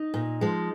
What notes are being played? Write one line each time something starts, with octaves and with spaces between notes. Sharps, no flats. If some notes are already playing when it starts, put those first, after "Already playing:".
Already playing: D#4
A#2
F3 G#3